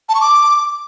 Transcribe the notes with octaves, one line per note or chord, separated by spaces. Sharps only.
A5
C#6
D6